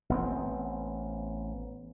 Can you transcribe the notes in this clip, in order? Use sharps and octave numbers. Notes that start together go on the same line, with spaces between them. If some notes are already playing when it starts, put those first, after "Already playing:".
A1 B3 C4